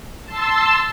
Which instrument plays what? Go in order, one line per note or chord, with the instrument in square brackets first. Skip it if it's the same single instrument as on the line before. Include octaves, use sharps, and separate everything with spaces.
[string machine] A5 C6 E6